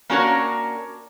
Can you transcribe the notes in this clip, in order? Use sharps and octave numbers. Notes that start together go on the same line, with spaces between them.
A#3 C#4 D4 F#4 A#4 C#5